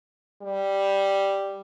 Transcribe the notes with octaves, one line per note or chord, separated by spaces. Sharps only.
G3